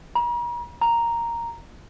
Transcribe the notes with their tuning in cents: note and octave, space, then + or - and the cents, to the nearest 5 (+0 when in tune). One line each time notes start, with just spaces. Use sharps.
A#5 +45
A#5 +0